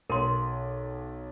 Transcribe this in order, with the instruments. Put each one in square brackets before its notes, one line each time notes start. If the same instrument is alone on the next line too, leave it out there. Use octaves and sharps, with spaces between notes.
[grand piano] B1 [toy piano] A#4 C6